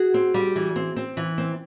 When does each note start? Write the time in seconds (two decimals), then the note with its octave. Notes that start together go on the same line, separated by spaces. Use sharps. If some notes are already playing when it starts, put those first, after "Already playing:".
Already playing: F#4 G#4
0.14 C4
0.34 G3
0.56 E3
0.76 C4
0.96 C4
1.17 E3
1.38 C4